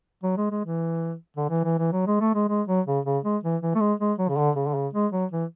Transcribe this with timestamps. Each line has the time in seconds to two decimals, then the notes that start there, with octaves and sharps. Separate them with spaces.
0.23 F#3
0.37 G#3
0.51 G#3
0.65 E3
1.36 D3
1.50 E3
1.64 E3
1.79 E3
1.92 F#3
2.07 G#3
2.20 A3
2.35 G#3
2.49 G#3
2.68 F#3
2.86 C#3
3.05 C#3
3.24 G#3
3.43 E3
3.62 E3
3.75 A3
3.80 G#3
4.00 G#3
4.18 F#3
4.29 C#3
4.37 D3
4.56 C#3
4.67 D3
4.75 C#3
4.93 G#3
5.12 F#3
5.31 E3